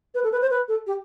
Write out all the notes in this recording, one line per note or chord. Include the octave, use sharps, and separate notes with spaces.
B4
A4
B4
C5
B4
A4
G4